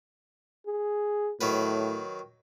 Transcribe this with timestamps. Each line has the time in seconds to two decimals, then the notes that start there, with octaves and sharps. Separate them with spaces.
0.67 G#4
1.41 A2 D#3 F#3 B4